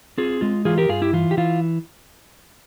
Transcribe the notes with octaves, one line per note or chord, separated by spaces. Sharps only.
C4 F4 G#4
G#3 F4
E3 F4 G#4
G4 A#4
G2 F4 G#4
E4 G4
E3 F4
G4
E3 F4